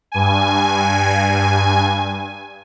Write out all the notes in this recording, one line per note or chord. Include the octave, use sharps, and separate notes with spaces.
G2 G#5